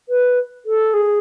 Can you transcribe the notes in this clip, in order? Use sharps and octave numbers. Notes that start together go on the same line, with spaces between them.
B4
A4
G#4